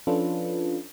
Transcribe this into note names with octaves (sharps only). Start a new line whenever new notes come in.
F3 C#4 D4 F4 A4 B4